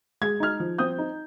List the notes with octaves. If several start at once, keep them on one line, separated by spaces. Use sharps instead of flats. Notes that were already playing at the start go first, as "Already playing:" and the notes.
G#3 G#6
D#4 F6 G#6
F3
C4 D#6 G6
D#4